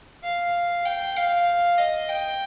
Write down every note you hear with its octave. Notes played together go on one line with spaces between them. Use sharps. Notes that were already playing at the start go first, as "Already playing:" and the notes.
F5
G5
F5
D#5
G5